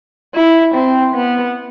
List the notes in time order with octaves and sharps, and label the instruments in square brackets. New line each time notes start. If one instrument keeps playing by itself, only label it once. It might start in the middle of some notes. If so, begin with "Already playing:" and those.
[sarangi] E4
C4
B3